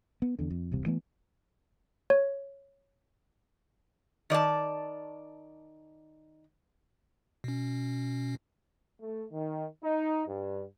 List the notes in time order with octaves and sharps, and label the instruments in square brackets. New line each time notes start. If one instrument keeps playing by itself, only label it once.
[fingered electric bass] B3
E2 D3
F2
E1 C2 C3
E3 A3 B3
[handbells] C#5
[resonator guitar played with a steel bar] D#3 D5 D#5 A5
[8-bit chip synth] B2 C#4
[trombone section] A3
D#3
D#4
G2